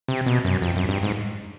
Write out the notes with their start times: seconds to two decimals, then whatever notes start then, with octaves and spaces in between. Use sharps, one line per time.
0.08 C3
0.26 B2
0.45 F#2
0.62 F2
0.76 F#2
0.89 G2
1.03 G#2